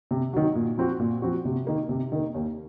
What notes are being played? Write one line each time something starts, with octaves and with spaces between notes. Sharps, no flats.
C3
D#3 F#3
A#2
F3 C4 F#4
A#2
F3 C4 F#4
C3
D#3 A#3
C3
D#3 A#3
D#2